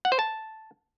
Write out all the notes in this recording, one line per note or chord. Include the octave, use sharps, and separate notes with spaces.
F#5
C5
A5